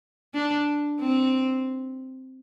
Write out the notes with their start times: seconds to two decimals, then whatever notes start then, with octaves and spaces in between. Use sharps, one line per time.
0.34 D4
1.00 C4